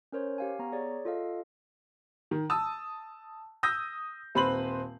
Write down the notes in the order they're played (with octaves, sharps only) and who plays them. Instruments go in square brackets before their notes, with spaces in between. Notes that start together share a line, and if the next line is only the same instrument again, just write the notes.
[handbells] C#4 A#4 C5 C#5
G4 F5 G#5
B3 A#5
G#4 C#5 D5
F4 A4 D#5 F5
[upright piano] D#3
A5 D#6 E6
D#6 E6 G6 A#6
D#1 C4 B4 B5 C6 F#7